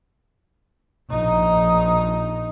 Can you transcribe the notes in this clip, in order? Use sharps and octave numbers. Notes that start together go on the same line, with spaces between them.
A#1 D#4